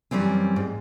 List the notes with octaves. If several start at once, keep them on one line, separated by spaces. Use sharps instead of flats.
F#2 E3 G3 C4 C#4
G#2